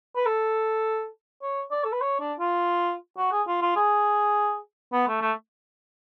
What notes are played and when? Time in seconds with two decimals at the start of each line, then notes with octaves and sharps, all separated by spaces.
0.16 B4
0.26 A4
1.42 C#5
1.71 D5
1.84 A4
1.92 B4
2.01 C#5
2.20 D4
2.39 F4
3.17 F#4
3.32 G#4
3.47 F4
3.62 F4
3.76 G#4
4.93 B3
5.08 A3
5.22 A3